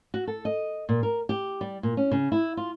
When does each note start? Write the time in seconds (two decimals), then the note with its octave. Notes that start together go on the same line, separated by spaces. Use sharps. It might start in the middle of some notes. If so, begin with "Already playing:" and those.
0.14 F#4
0.27 A4
0.45 D#5
0.89 A#2
1.03 A#4
1.29 G4
1.61 G3
1.83 A#2
1.97 C#4
2.11 C#3
2.32 E4
2.57 F4